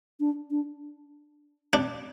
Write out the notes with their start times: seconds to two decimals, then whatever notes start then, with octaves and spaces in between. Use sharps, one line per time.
0.20 D4
0.51 D4
1.73 C4 D4